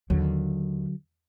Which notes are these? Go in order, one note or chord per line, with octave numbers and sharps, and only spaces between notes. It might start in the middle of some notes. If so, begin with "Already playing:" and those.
D#2 D3 F#3